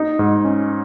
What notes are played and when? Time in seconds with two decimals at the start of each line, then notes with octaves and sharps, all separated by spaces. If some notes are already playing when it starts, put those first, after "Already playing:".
Already playing: D#4
0.19 G#2
0.45 C#4